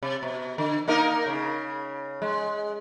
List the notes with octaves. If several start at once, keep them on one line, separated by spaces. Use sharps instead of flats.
C3
B2
D3
A#3 D#4 A#4
C#3
G#3